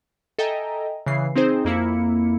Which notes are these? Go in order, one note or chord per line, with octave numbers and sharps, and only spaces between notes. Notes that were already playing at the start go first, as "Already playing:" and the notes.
A4 D#5 E5 G5 G#5 A#5
C#3 E3 C7
C4 D#4 G#4 C5
F2 A#3 E4 C#7